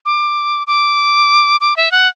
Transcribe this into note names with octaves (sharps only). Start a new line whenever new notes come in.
D6
D6
D6
E5
F#5